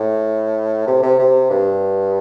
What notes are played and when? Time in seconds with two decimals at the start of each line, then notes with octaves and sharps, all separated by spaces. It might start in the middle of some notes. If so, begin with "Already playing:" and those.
Already playing: A2
0.87 C3
1.03 C3
1.19 C3
1.50 G2